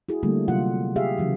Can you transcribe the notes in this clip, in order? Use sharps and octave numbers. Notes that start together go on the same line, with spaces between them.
E4 F#4 G#4
D3 G3 A3 A#3
C3 F#3 F4 F#5
G4 G#4 E5 F5
C#3 E3 F#3 F#4